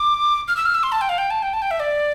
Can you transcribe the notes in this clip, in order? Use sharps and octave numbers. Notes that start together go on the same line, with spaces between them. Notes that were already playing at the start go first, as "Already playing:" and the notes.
Already playing: D6
F6
E6
F6
E6
C6
A5
G5
F5
G5
A5
G5
A5
G5
E5
D5